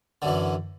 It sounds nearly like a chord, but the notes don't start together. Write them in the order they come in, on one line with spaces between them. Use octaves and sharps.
D3 F#2 E3